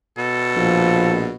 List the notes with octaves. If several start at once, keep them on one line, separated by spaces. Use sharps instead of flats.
B2 A4
A#1 F3